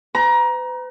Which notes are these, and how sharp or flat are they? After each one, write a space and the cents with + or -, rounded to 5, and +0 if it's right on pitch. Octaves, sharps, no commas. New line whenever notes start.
B4 +45 A#5 +25